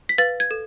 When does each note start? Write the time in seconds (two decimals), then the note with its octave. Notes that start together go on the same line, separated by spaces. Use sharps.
0.09 B6
0.18 B4 F5 A6
0.40 G#6
0.51 A4